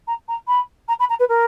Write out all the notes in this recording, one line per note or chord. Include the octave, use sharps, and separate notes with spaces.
A#5
A#5
B5
A#5
B5
A#5
B4
A#4